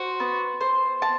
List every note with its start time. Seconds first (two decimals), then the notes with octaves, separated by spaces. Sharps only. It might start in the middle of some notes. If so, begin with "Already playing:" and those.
Already playing: F#4 C5
0.20 B3
0.61 C5
1.02 A5